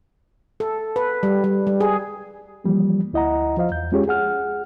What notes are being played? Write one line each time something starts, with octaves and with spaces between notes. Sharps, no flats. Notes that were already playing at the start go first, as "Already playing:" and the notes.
A4
B4
G3
G3
G3
G#4
E3 F3 G3 A#3
D2 E4 D#5 F#5 A#5
F3 F4 C5 D#5 F5
E2 G6
G#3 C#4 F4 G4 G#4 C#5
G#4 F#5 F6